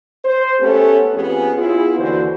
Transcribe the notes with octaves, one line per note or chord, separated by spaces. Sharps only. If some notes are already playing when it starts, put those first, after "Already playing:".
C5
A3 B3 C#4 G4 A4
F2 B3 C#4 G4 G#4
B3 E4 F4 G#4
D#2 D3 E3 F#4 B4 C5